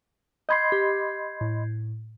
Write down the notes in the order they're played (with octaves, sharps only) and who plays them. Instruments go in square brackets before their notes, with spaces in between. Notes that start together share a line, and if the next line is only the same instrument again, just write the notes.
[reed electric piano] D#5 B5 C6 [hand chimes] G6 G#6 C7
[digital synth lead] G4
A2